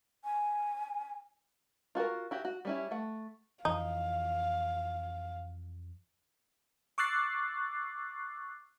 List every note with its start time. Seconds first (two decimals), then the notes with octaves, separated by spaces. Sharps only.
0.24 G#5
1.95 F4 F#4 A4 A#4
2.31 E4 F#4 G4
2.45 F#4
2.65 G3 C#4 E4
2.91 A3 F#5
3.65 F2 E3 D#4 F5
6.98 C#6 D6 E6 F#6 A6 C7